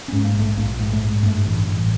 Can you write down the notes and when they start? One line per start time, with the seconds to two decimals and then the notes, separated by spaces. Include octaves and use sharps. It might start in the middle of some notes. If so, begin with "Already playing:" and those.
0.08 C#4
0.13 G#2
0.24 A#3
0.34 A#1
0.40 A3
0.57 A#1 A#3
0.79 G#2
0.90 A3
1.01 G#2
1.23 G2 A3
1.45 A1
1.66 A1